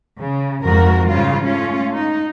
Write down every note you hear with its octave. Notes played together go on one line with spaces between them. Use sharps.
C#3
F2 G#2 F#4 A#4
G#2 C#3 G3 F4
A3 C#4 F4
D#4